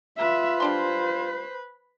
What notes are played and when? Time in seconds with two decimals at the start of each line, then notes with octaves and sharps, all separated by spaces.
0.18 F4 B4 E5
0.60 G3 D4 C5 C6